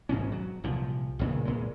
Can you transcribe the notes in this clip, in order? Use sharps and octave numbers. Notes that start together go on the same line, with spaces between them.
G#1 G#2 B2 C#4
F#3
C2 A#2 F3
C#2 A#2 C#3
A#2 G#3